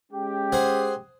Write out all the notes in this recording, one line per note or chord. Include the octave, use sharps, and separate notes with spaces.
G#3 C#4 G4
G#4 C5 F#5